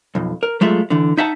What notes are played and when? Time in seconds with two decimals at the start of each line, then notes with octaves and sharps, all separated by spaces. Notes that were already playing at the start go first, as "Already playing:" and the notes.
0.15 B1 F2
0.43 A#4
0.61 F#3 G#3 A3 F4 E5
0.90 D3 E3
1.17 D#4 E5 F#5 A5